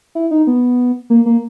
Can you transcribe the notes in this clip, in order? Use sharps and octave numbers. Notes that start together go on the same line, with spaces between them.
E4
D#4
B3
A#3
A#3